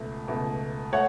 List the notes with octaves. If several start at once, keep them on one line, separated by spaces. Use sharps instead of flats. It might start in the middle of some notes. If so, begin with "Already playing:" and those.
Already playing: C#2 B2 A3
C#2 B2 A3
A3 C#5 F#5